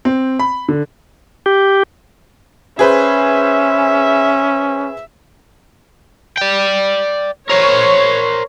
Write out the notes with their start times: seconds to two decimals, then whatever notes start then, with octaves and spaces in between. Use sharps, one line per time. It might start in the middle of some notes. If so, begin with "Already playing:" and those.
0.05 C4
0.39 B5
0.68 D3
1.46 G4
2.79 C#4 G#4 B4 C5 E5
6.37 D5 G5
7.50 A#4 C5 C#5